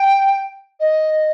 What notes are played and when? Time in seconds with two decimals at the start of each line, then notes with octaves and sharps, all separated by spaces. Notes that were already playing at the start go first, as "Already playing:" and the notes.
Already playing: G5
0.80 D#5